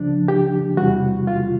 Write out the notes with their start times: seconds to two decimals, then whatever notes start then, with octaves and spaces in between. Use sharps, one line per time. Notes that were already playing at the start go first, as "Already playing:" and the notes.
Already playing: C#2 C#3 F3 D4
0.28 G4
0.77 E2 C3 E3 G3 F#4
1.27 F4